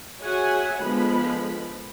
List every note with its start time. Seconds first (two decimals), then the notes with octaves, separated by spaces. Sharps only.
0.22 F#4 G#4 C#5 E5 F#5 G#5
0.81 D3 F3 G#3 B3 B5